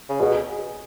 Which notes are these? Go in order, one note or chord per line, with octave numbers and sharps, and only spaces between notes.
C#3
B2 G#4